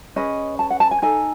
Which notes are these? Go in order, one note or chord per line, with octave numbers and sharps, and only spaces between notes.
C#4 G#4 B4 D#5
A5
F#5
A5
G#5
D#4 A4 G#5